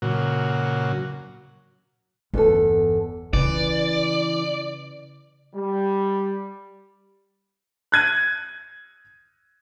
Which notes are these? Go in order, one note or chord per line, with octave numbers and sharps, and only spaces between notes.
A#2 C#3 F#3
G1 E2 A4
C#3 E3 D5
G3
F#6 G#6 D#7